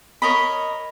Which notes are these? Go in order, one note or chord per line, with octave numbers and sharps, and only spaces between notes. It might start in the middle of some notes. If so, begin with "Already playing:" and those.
A#4 C#5 D#5 B5